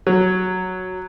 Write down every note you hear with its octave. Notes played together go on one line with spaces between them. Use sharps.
F#3